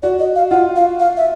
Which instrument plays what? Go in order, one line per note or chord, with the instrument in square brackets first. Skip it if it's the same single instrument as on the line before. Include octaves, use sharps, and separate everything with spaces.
[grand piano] F#4 [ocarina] D5
[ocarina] D#5
F5
[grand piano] F4 [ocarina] F#5
[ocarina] F5
F5
E5